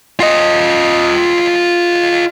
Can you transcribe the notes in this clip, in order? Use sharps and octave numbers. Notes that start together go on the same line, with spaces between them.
F4 D#5